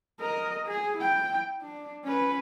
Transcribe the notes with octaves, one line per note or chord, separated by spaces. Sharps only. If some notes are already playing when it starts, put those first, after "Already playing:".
A#4 D#5
G#4
E4 G5
D4
C#4 B4